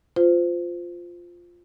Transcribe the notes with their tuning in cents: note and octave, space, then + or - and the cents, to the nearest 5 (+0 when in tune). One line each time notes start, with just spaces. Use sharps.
F4 +0 C5 -25